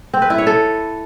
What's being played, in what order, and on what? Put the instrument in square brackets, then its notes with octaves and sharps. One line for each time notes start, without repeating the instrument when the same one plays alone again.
[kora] C4
B4
E4
C#5
A4